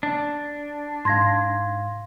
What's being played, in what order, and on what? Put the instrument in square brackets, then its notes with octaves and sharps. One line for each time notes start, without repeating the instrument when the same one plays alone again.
[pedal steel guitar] D4
[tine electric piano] G#2 F5 [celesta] C6 G#6 A#6